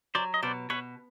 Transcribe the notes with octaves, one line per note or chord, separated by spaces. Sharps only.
F#3 C5 D5
D#5
B2 C5 D5
B2 B4 C#5